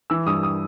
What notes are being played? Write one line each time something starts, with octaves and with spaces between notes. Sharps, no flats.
E3 E6
G2 D#6
D#6